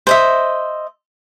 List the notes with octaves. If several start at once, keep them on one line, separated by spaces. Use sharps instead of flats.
C5 D#5 E5